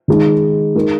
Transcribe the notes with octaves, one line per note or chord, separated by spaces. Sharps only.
D#3 G#3 D#4
G#3 D#4 A#4